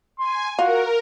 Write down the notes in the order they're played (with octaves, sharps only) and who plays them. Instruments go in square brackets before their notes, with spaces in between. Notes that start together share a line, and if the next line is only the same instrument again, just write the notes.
[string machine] G#5 [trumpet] C6
[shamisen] F4 [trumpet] F#4 [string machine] A#4